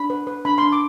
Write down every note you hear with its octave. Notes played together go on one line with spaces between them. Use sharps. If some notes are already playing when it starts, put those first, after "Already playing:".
Already playing: D4 B5
B4
B4
D4 B5
D4 C6
D6